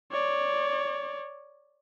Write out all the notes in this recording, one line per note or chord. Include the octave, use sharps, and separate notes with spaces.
C#5 D5